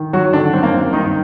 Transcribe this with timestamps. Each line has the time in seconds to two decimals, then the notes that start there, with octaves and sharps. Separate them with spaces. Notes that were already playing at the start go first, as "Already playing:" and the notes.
Already playing: D#3
0.13 F#3 F#4
0.33 D3 D#3 D4
0.53 F#2 C4
0.63 A#3
0.73 F#2 C4
0.93 G2 D#3 D#4